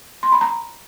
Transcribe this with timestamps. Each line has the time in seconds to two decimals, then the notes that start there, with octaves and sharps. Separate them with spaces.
0.23 C6
0.32 B5
0.41 A#5